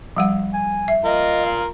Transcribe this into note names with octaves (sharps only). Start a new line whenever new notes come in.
F3 G3 F#5
G#5
E5
F4 A#4 D#5
F5